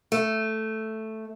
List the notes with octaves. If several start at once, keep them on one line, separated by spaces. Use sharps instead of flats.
A3